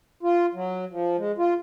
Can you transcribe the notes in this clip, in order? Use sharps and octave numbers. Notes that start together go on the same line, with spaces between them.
F4
F#3
F3
G#3
F4